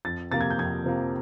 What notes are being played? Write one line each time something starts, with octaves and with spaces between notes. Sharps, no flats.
F2 A6
C3 F3 A#3 A6
G#6
G6
F2 G#6
C3 F3 A#3